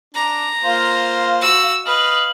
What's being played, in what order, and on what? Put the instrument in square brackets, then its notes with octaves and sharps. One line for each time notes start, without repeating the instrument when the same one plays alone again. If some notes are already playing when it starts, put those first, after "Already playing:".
[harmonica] D4 [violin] A#5
[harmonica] A#3 F4 C5 [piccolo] F5
[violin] F#4 E6
[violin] B4 [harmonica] D#5 F5 [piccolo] F#7